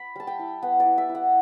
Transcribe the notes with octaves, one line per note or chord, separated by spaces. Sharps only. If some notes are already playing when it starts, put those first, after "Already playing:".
Already playing: B5
G3 A5
G5
E4
B3 F#5
D5
E4
E5
E4
F#5